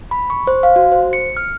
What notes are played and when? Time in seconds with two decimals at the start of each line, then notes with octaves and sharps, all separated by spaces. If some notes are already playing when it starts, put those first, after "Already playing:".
0.11 B5
0.30 C#6
0.47 C5
0.63 F5
0.76 F#4
0.92 C5
1.13 C#7
1.37 F6